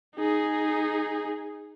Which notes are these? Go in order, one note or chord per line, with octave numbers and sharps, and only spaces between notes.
D#4 G#4